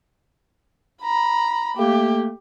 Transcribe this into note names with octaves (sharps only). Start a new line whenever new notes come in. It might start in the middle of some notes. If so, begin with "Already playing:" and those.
A#5 B5
A3 A#3 G4